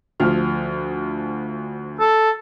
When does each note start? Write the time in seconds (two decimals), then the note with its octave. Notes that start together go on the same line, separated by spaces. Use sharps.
0.20 D2 F3 F6
2.00 A4